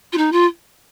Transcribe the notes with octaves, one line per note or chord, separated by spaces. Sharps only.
F4
D#4
F4